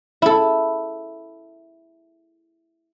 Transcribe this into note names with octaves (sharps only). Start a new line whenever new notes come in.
E4 A4